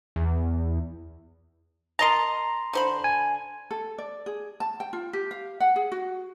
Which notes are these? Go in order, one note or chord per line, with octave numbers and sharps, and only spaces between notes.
E2
A#4 D#5 A5 A#5 C6
D3 C5 B5
G#5
A4
D5
G#4
A5
G5
F4
G4
F5
F#5
G#4
F#4